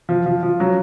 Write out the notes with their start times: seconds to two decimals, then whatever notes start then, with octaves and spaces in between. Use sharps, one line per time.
0.09 F3
0.26 F3
0.43 F3
0.60 F#3